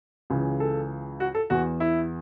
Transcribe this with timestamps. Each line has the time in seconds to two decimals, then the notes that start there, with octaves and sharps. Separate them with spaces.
0.30 C#2 C#3 E3
0.60 A4
1.20 F#4
1.35 A4
1.50 E2 E3 F#4
1.80 E4